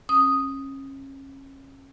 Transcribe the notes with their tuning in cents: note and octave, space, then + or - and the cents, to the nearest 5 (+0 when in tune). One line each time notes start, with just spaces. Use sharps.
C#4 -30 D#6 +0